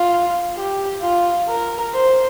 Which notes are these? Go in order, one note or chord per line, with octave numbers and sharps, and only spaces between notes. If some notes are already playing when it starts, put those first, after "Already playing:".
Already playing: F4
G4
F4
A#4
C5